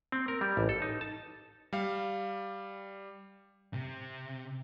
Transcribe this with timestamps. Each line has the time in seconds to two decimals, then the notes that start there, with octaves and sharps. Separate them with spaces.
0.12 C4
0.28 A#4
0.41 G3
0.57 A1
0.69 A4
0.82 D#4
1.01 A5
1.73 G3 F5
3.74 C3